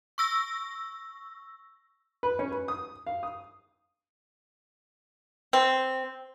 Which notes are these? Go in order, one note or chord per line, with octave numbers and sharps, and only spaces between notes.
C#6 E6 A#6
B4
C#4
B4
D#6
F5
D#6
C4